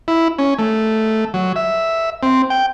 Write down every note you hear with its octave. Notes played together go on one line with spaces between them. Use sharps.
E4
C#4
A3
F#3
E5
C4
G5